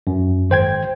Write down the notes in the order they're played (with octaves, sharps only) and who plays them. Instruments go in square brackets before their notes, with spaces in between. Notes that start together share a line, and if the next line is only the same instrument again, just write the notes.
[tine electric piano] F#2
G#1 C5 G5 G#6